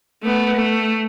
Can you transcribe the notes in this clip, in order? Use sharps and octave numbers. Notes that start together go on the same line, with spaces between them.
A3 B3
A3